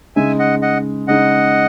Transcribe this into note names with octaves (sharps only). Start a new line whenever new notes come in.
C#3 G#3 D#4 E5 G#5
D#5 F#5
D#5 F#5
C#3 G#3 D#4 D#5 F#5